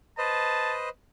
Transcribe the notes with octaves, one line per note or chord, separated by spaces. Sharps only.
B4 C5 D#5 A5